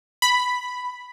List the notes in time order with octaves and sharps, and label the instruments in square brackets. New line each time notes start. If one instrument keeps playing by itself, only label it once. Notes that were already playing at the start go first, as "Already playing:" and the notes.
[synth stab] B5